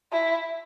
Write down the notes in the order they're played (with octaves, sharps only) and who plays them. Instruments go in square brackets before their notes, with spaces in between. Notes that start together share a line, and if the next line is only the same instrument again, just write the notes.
[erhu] E4